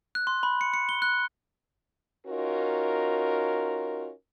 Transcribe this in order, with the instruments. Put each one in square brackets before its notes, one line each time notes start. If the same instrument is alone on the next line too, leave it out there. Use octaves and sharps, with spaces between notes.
[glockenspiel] F#6
C6
B5
C#7
C#7
G7
F#6
[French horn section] C#4 D#4 F4 F#4 A#4